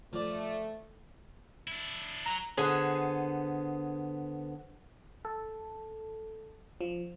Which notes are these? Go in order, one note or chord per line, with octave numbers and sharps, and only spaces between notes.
F3 A3 D5
D4 E4
F#3 A#5
D3 B3 G#4 C5
A4
F3